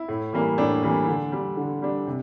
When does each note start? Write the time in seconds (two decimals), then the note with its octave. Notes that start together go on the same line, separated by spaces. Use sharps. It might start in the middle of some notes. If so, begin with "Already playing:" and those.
Already playing: E4
0.08 A2
0.33 E3 G3 A#3
0.58 A2 D4
0.83 E3 G3 A#3
1.08 D3
1.32 G3 D4
1.57 D3
1.82 G3 D4
2.07 C3